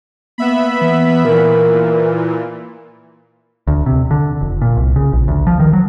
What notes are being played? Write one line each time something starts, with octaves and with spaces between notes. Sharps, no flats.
A#3 B3 E5 B5
E3
A#2 E3 A#4
D2
C3
D3
F1
A#2
C2
C#3
A#1
D2
F3
D#3
F#3